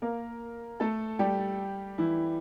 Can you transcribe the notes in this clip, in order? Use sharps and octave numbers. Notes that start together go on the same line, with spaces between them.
A#3 A#4
A3 A4
G3 G4
E3 E4